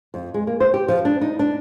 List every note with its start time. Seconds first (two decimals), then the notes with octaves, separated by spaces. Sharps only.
0.14 F2
0.34 G#3
0.47 A#3
0.60 C5
0.74 G4
0.88 F3
1.05 D4
1.21 D#4
1.39 D4